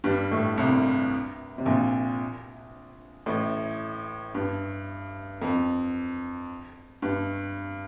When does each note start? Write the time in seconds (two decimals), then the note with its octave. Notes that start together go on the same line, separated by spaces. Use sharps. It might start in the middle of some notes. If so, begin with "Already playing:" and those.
0.04 G2 G3
0.31 A2 A3
0.58 C2 C3
1.58 C3
1.65 A#1 A#2
3.26 A1 A2
4.35 G2
5.41 F2
7.02 G2